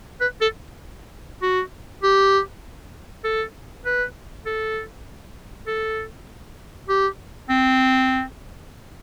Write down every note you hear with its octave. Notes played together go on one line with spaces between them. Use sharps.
B4
A4
F#4
G4
A4
B4
A4
A4
G4
C4